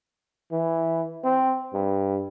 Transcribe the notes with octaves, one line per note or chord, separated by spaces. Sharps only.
E3
C4
G2